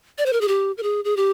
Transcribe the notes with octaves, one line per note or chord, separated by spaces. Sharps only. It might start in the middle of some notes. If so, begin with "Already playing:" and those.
D5
C5
A#4
G#4
G4
A#4
G#4
G#4
G4